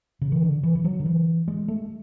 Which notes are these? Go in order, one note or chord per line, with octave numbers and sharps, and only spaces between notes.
C#3
E3
D3
E3
E3
F#3
D3
E3
G#3
A3